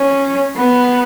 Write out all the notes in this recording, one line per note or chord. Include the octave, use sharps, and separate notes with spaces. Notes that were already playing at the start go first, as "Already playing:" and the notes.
Already playing: C#4
B3